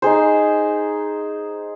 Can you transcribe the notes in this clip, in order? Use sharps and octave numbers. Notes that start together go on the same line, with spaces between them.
D#4 G#4 C5